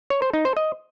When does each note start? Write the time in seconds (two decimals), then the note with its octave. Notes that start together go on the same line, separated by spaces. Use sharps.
0.10 C#5
0.22 C5
0.33 D#4
0.45 C5
0.57 D#5